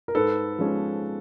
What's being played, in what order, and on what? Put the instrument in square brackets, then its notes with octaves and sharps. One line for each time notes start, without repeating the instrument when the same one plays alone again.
[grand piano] A#4
[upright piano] G#2 [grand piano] A4 B4
[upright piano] F3 G#3 C#4